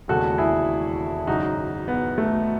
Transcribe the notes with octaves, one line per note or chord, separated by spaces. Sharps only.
E1 D#2 C#3 G#3 F#4 A4
E4 G#4
G#1 F#2 C#3 D#4 F#4
B3
A3